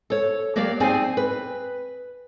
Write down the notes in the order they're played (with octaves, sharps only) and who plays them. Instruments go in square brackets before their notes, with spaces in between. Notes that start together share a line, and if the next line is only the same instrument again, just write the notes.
[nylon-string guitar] A4 C#5
F#3 A#3 G4 D5 F5
C4 D#4 G#4 D5 G#5
B4